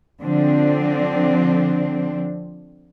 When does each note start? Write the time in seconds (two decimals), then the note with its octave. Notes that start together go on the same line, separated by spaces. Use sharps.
0.22 D3 F3 C4 D4